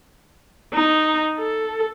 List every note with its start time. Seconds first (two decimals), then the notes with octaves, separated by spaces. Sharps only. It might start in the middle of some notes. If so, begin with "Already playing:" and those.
0.74 D#4
1.39 A4